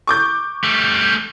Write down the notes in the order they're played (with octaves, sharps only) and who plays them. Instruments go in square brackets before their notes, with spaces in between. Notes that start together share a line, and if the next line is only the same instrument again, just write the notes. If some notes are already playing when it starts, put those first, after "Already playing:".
[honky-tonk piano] C#6 D6 G6
[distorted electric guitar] G3 A3